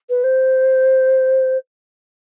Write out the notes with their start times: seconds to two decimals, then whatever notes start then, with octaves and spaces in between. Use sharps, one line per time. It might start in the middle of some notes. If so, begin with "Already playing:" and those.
0.10 B4
0.24 C5